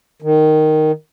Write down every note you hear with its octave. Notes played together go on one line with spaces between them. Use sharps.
D#3